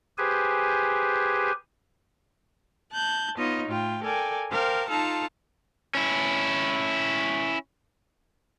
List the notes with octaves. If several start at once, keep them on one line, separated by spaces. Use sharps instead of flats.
G4 G#4 B4 C5 G#5
A5 F#6 G6
B3 D#4 F4 C#5 D#5
A2 F4 G5
A4 A#4 D5 G5 G#5
A#4 C5 F5 G5 A5 D6
D#4 F4 A4 F5 A5 A#5
C#4 E4